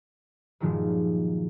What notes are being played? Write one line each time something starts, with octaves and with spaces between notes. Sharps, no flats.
G2 A#2 D#3 F3 F#3 G#3